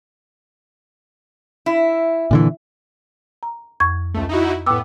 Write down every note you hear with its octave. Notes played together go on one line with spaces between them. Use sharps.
E4
A#2 D3 E3
A#5
F2 C#6 G#6
C#2 A3
D#4 E4 F#4
A2 B3 G5 D6 E6